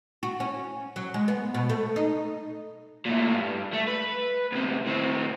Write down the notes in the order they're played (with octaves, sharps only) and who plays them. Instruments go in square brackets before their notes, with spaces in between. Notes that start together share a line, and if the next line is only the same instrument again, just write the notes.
[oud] F#4
C#4
F#3
G#3
B3
B2
A3
D#4
[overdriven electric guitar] A#2 A3
G2
A3
B4
D2 C3
A2 C4